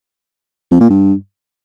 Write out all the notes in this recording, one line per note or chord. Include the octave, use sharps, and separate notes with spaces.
F2
A#2
G2